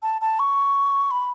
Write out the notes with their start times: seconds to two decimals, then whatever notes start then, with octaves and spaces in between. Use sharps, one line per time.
0.03 A5
0.21 A5
0.39 C#6
1.11 B5